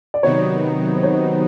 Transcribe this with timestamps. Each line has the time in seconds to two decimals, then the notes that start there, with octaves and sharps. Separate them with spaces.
0.14 D5
0.23 C3 D#3 F#3 B3 D#4 C#5
0.95 C5
1.03 C#5
1.12 C5